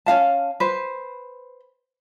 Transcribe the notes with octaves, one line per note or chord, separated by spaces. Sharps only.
C#4 D#4 F5 A5
B4 C5